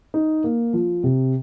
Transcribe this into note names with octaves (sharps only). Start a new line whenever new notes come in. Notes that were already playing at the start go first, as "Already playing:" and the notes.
D#4
A#3
F3
C3